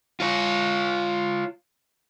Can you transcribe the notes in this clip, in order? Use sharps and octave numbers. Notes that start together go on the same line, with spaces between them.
F4 C#5